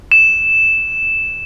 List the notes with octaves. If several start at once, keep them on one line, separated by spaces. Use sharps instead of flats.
E7